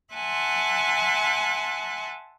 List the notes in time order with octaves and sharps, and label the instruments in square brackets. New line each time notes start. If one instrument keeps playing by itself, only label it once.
[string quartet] E5 F#5 G#5 A5 C6 F#6